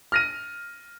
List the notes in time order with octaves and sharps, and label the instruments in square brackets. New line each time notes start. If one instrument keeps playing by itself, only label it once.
[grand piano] F6 A#6 D#7